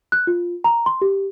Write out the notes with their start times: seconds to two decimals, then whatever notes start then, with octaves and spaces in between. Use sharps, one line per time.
0.12 F#6
0.27 F4
0.64 A#5
0.86 C6
1.01 G4